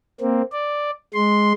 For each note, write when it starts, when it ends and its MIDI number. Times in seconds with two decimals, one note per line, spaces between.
0.21 0.42 58
0.21 0.42 60
0.52 0.90 74
1.14 1.53 56
1.14 1.53 84